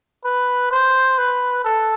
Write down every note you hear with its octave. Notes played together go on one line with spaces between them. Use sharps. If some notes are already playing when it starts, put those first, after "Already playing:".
B4
C5
B4
A4